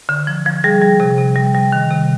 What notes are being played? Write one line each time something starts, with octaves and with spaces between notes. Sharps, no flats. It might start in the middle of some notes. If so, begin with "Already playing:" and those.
D3
F3
F3
G3 G#4
G3
C3
C3
G3
G3
D#3
C3